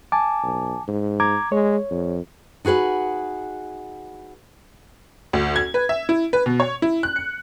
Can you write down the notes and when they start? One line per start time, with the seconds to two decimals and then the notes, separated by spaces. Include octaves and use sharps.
0.12 G#5 A5 D6
0.43 B1
0.88 G#2
1.20 A#5 D6 G#6
1.52 G#3 C#5
1.90 F2
2.65 D#4 F#4 G#4 B4 F#5
5.33 D2
5.56 G#6
5.74 B4
5.89 E5
6.09 E4
6.33 B4
6.46 B2
6.60 C#5
6.82 E4
7.03 F#6
7.16 C#7